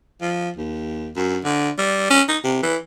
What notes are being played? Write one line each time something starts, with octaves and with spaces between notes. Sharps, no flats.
F3
D#2
F#2
D3
G3
C#4
D#4
C3
E3